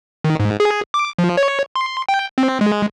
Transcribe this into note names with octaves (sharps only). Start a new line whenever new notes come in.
D#3
G#2
G#4
D6
F3
C#5
C6
G5
C4
G#3